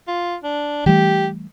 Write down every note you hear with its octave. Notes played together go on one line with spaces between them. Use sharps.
F4
D4
E3 G3 A3 G4